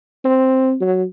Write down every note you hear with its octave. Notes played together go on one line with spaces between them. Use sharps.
C4
F#3